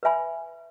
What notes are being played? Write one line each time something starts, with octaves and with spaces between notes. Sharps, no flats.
B4 E5 G#5 B5